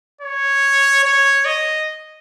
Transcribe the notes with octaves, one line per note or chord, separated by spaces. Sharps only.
C#5
C#5
D#5